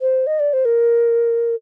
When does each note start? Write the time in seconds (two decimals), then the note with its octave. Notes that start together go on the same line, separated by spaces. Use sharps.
0.01 C5
0.27 D#5
0.39 D5
0.53 C5
0.65 A#4